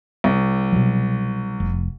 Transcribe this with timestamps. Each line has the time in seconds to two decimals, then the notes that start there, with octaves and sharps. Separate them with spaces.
0.24 C2
0.73 B2 F#3
1.60 F1